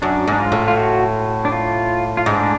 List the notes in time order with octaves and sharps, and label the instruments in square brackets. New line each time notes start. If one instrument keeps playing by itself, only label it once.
[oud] F#2 [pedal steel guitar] D4
[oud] G#2
[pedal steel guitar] D4
F4
[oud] A2
[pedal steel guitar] F4
F#4
D4
F4
F4
[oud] G#2 [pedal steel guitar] D4